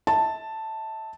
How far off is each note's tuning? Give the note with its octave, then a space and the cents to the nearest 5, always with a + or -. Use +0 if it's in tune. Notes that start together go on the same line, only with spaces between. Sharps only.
E5 -40 A5 +5